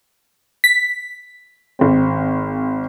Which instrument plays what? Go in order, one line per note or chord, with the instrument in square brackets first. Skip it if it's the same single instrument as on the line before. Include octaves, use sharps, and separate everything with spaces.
[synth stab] B6
[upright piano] G#1 C4